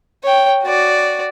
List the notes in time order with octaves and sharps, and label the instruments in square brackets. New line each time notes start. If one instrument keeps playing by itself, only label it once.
[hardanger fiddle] C#5 G5
F#4 D5